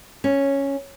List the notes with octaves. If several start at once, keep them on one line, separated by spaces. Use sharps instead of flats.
C#4